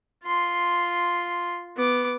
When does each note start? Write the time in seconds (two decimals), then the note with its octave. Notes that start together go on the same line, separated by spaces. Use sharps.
0.24 F4 C6
1.76 B3 D6